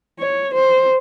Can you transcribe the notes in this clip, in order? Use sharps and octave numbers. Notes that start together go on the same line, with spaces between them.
C#5
C5